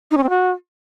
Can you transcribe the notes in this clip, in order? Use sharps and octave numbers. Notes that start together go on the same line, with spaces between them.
D#4
C#4
C4
F#4